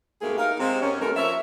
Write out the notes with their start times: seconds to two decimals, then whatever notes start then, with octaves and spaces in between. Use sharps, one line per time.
0.22 G#2 B2 A3 A#3 G4 G#4
0.38 D#4 A#4 F5
0.60 C3 G#3 C4
0.81 F#2 C#4
1.00 D#2 A3 B3 A#4
1.16 F3 A#4 C#5 E5